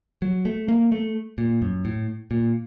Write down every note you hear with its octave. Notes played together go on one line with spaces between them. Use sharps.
F#3
A3
A#3
A3
A#2
F#2
A2
A#2